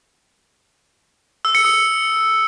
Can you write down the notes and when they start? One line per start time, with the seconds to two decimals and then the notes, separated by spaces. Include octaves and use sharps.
1.45 E6
1.55 C#7
1.65 D#6